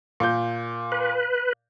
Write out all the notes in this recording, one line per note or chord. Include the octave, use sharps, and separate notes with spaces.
A#2 G6
B4